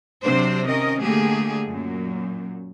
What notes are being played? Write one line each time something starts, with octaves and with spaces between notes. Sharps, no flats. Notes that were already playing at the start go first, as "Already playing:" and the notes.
C3 F#3 C4 D4 C5
D#3 C#4 A#4 D#5
D3 A3 A#3 G4 G#4
F#2 A#2